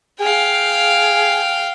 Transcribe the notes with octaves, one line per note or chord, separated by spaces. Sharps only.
G#4 F5 G5